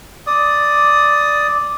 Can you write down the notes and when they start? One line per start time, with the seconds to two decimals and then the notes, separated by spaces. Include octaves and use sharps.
0.27 D5 D#6